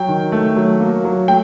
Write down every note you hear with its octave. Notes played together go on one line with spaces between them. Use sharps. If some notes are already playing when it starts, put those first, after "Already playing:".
Already playing: F#3 G5
D#3
A3
F#3
A#3
F#3
A3 G5